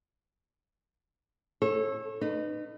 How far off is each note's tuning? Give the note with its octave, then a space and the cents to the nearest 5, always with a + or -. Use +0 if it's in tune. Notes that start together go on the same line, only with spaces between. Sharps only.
A4 +0 C#5 -35
D#4 -30 B4 +10